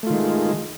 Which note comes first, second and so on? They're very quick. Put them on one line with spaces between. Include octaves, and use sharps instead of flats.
A3 F4 D#3 G#3